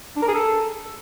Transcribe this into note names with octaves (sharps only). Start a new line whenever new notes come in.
D4
A#4
G#4
A4